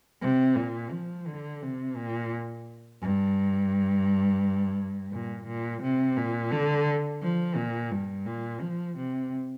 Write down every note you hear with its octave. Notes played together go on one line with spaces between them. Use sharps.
C3
A#2
F3
D3
C3
A#2
G2
A#2
A#2
C3
A#2
D3
F3
A#2
G2
A#2
F3
C3